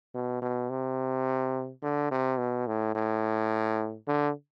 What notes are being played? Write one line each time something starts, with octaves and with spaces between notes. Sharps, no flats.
B2
B2
C3
D3
C3
B2
A2
A2
D3